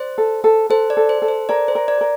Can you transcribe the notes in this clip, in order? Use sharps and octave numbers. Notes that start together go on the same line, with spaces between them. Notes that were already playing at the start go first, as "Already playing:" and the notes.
Already playing: C5 D5
A4
A4
A4 C5
D5
A4
C5
A4
C5
A#4 D5
C5
A#4
D5
A#4